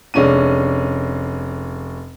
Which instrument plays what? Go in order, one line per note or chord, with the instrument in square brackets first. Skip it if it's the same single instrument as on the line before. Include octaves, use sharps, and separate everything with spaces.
[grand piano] F1 G#3 C#4 D4 D#7